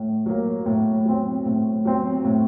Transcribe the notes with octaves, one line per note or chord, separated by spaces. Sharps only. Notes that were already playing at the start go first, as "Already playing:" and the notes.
Already playing: A2
F#3 A#3
A2
F#3 C4
A2
F#3 C4
A2